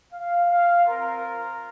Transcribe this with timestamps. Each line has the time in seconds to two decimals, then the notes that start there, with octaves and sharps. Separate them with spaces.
0.13 F5
0.50 F5
0.86 C4 F4 A#4